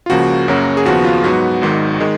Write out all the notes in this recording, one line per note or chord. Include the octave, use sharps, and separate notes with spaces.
F4
C#2 C#3 F3 A#3 F#4
F#2 C#3 F#3 A#3 C#4
G#4
D#2 C#3 F3 B3 F#4
F4
G#2 F#3 B3 F#4
G#1 G#2 D#3
D#3 G#3